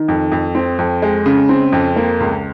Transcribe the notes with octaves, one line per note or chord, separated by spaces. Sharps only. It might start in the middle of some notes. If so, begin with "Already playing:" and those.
Already playing: D#3
F2
F2
C4
F2
G#3
C#3
C4
F2
A#3
C#2